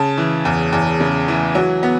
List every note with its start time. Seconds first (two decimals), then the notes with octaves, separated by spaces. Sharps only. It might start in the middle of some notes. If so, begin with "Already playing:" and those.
Already playing: C#3 A5
0.18 E3
0.45 E2
0.73 E2
1.00 C#3
1.28 E3
1.55 F#3
1.83 B3